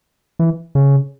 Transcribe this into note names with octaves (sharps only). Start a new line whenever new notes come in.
E3
C#3